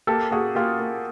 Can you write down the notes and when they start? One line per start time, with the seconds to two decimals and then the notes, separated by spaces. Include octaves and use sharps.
0.07 A#3 G4 A4
0.31 A#3 F#4 G#4
0.55 A#3 F4 G4
0.80 A#3